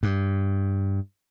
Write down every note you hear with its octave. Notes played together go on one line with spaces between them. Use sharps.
G2